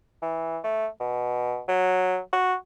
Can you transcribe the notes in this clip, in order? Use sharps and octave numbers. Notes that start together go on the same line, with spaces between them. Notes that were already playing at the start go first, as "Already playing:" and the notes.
E3
A3
B2
F#3
F#4